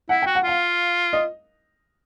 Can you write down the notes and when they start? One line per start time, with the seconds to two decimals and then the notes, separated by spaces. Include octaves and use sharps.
0.09 E4 F#5
0.22 F#4 G5
0.35 F#5
0.44 F4 F5
1.13 D#5